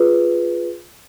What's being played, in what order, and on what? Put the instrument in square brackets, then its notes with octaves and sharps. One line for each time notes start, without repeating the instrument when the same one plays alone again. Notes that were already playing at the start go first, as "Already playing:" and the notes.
Already playing: [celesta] F4 G#4 B4